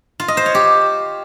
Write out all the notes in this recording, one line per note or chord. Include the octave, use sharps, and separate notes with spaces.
F4
D#5
C5
C#5
G4